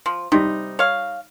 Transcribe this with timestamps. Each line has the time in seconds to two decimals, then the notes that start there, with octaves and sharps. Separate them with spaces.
0.06 F3
0.32 C3 G3 D#4
0.79 C#5 F5